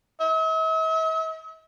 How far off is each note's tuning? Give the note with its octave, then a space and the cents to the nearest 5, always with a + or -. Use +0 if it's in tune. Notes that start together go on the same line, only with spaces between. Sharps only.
E5 -45